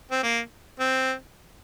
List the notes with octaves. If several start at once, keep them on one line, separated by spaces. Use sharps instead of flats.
C4
A#3
C4